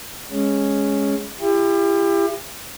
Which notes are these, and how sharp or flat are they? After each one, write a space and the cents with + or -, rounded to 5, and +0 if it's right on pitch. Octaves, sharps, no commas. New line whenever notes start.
G#3 +0 C#4 +0
E4 +40 G4 +35